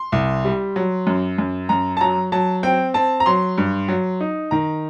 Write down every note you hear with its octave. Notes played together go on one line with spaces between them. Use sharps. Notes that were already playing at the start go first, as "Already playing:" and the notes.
Already playing: C6
C2
G3
F#3
F#2
F#2
F#2 A#5
A5
F#3 A#5
F#3 A5
C4 G5
C4 A5
A#5
F#3 C6
G2
F#3
D#4
D#3 A#5